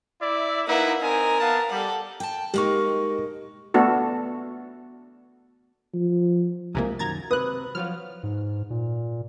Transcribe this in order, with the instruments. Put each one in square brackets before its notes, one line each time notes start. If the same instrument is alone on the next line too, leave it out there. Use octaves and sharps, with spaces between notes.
[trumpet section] E4 D5 E5
[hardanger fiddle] A#3 F#5 [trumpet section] D#4 E4 B4
[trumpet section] C4 D#4 G#5 [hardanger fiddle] A#4
[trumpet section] B3 F5 A5
[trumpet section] G3 [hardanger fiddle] A4 F#5
[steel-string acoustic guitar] G5 A5
[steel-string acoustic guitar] G#3 A#3 D#4 [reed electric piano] G4 C#6
[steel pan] A3 B3 D4 F#4 A4
[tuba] F3
[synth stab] C2 C3 A#3 [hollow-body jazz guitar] G#3 G#5 A#5
[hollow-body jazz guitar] F#2 D#3 [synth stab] A#5 G#6 A6
[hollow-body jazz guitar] C3 [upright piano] B4 [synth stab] D#6 F#6
[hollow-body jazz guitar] F3 F#3 F4 [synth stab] F6
[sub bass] G#2
A#2